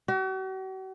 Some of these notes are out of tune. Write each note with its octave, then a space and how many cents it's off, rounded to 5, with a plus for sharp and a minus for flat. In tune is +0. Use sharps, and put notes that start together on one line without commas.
F#4 +45